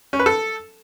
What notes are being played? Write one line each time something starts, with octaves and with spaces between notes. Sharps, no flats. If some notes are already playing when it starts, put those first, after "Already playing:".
C#4
B4
A4